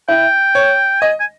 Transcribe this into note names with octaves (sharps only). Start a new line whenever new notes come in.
E4 G5
C#5
D#5 G#5
G#5